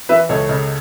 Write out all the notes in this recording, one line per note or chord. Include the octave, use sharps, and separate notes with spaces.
E3 B4 E5
C#2 A4 C#5
C#3